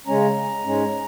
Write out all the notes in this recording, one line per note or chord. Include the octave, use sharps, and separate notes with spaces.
C#3 G#3 C#4 A#5
G#2 G#3 C#4